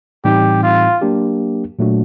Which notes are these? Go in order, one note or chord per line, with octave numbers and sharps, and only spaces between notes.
A2 E3 G3 C4 D#4 G4
F4
F#3 A#3 D4 G4
A#2 F#3 A3 D4 F#4